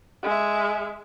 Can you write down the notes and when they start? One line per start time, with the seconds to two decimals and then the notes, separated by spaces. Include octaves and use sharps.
0.23 G#3 E5